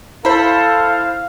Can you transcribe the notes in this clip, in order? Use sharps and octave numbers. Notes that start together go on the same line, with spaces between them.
E4 A4 C5 F5 B5